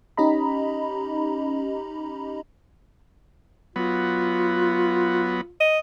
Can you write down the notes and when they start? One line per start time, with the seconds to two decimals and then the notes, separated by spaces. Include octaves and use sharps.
0.17 C#4 D#4 G4 D#5 A#5 B5
3.76 F#3 B3 F4
5.61 D#5